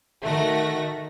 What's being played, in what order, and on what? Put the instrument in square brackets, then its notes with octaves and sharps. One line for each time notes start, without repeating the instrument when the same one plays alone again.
[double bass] D#3 [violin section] A3 F#4 A#6